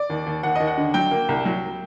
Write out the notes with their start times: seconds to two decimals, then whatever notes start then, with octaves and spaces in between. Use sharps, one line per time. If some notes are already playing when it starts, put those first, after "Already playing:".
Already playing: D5
0.10 D#2
0.26 D#2
0.43 D#2 F#5
0.56 D#2 D#5
0.67 F#5
0.77 D3
0.94 F#3 G5
1.11 A#3
1.29 C2
1.45 F#3